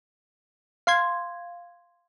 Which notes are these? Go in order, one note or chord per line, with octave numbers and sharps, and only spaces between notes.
F5 C6 G#6